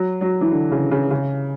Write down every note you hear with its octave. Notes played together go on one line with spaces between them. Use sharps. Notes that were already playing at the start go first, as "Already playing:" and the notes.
Already playing: F#3
F#3
E3
D3
C#3
C#3
C#3